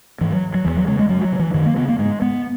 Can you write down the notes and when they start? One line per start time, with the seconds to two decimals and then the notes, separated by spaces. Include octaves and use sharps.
0.21 G#2 E3
0.32 F#3
0.54 F#3
0.65 E2 E3
0.77 F#3
0.87 C#3 G#3
0.99 G#3
1.09 F#2 F#3
1.24 F#3
1.32 C#3
1.39 E3
1.54 F#2 D#3
1.66 A#3
1.77 C#3 B3
1.89 A#3
1.99 G#2 G#3
2.22 B3